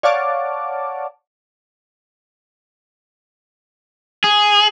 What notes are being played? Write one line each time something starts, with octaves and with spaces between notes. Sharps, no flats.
C#5 D5 F5 F#5 A5 D6
G#4